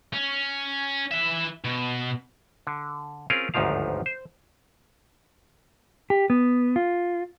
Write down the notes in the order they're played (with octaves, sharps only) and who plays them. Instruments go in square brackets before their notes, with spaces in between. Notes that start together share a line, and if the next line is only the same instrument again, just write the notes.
[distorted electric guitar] C#4
E3 E5
B2
[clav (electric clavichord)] D3
C4 C#4 F4 G#4 A#4
G1 D2 G#2 D#3 F3 F5
C5
[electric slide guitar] G4
B3
F4